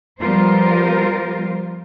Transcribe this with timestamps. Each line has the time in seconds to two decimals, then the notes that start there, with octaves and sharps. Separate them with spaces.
0.18 F3 G3 B3 F4 A#4 C5